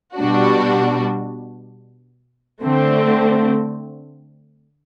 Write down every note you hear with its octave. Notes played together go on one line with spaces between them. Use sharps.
B2 G3 D4 F#4
D3 A3 C4